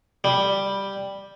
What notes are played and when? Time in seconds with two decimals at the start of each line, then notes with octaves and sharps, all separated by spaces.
0.24 G3